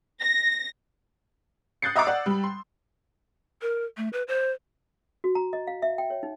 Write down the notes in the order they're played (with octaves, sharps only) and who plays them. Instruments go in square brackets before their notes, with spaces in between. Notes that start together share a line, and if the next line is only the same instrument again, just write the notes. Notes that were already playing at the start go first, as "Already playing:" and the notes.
[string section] A#6
[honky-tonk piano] D#6 F#6 G6 A6 C7 C#7
D#5 E5 A#5 C#6 D6 E6
D5 F#5
G3 B5
C6
[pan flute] A#4
A3
B4
C5
[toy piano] F#4
A#5
D#5
F5
E5
G5
C#5
D#4